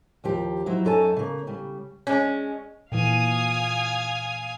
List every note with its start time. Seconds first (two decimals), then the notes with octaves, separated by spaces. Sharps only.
0.24 D#2 F3 G4
0.66 F3 F#3 D#4 E4
0.85 F#2 D#4 A4 C#5 G#5 A5
1.16 C#3 A#3
1.47 C#3 G3
2.07 G#3 C#4
2.92 A#2 E3 F5 G#5 D#6